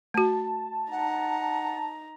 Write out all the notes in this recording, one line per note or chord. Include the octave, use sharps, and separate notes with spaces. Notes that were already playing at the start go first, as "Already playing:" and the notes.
A3 F#4 A5
D#4 F#5 A#5